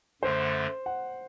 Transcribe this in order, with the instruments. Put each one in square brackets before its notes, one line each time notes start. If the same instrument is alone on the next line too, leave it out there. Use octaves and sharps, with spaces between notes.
[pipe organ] F#2 D3 A3 [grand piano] C5
[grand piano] F#5